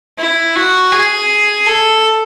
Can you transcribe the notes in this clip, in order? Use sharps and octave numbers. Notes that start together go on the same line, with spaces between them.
E4
F#4
G#4
A4